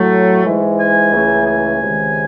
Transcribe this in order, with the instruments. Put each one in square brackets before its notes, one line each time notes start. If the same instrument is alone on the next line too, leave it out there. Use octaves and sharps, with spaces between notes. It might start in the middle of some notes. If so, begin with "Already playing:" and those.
Already playing: [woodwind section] A2 F#3 A3
G#2 E3 G#3
G#5
C#2 C#3 E3 A3
G#5
C#2 C3 D#3 G#3